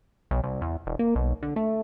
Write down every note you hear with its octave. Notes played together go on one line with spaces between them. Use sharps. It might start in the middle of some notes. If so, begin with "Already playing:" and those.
B1
C2
E2
E1
A#3
B1
D3
A3